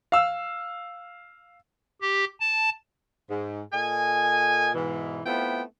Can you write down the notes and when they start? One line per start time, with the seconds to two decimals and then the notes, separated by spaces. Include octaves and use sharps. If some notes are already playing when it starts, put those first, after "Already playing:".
0.12 F5 E6
2.02 G4
2.40 A5
3.30 G#2
3.73 A#2 A4 D#5 G#5
4.75 G#2 B2 E3
5.25 A3 B3 C4 E4 F4 G5